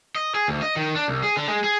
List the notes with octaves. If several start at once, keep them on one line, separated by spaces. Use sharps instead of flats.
D#5
G#4
D2
D#5
D#3
D4
C2
G#4
D3
G#3
G#4